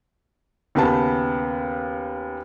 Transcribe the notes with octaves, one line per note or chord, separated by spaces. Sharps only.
D#2 C#3 B3 A5